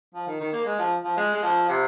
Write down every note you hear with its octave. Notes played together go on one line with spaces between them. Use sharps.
F3
D#3
D#3
A#3
G#3
F3
F3
G#3
G#3
F3
C3